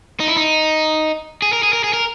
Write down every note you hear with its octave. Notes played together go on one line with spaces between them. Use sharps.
D#4
E4
D#4
G#4
A#4
G#4
A#4
G#4
A#4